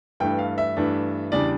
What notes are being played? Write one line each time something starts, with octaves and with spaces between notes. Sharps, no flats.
G2 E3 A3 D4 G5
F5
E5
G2 E3 A3 D4
E2 C#3 G3 D4 D5